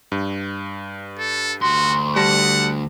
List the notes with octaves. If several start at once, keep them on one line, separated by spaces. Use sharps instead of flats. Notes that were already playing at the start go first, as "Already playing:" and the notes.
G2
A4
D2 F#4 C6
G3 F#5 A5 A#6